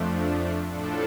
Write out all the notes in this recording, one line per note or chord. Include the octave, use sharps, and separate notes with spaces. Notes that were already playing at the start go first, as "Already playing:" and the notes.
Already playing: F2 F3 A3 D4
A2 F3 D4 A4